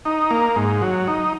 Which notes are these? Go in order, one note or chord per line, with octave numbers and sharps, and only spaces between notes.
D#4
A#3
G#2
F#3
D#4